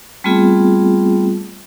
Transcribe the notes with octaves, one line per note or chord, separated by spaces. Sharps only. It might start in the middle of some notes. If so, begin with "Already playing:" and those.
G3 A3 B3 C4 F4 G#4